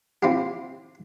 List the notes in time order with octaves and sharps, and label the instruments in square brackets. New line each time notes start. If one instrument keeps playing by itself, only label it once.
[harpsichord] C4 E4 F4 G4